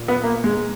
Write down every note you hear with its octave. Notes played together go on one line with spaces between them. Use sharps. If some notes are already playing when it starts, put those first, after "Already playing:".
Already playing: A#2
B3
A#3
G#3